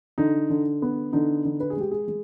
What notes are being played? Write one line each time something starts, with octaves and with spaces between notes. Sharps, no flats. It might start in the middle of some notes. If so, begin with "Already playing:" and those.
D3 D#4
D3
B3
D3 D#4
D3
B4
G#4
G#3 G4
G#4
G#3